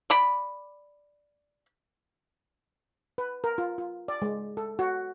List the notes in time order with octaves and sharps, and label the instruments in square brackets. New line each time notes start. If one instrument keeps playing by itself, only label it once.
[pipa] D5 B5
[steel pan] B4
A#4
F4
F4
D5
G#3
A4
F#4